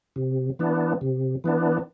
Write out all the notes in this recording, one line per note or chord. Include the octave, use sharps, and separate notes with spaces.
C3
E3 B3 D4
C3
E3 B3 D4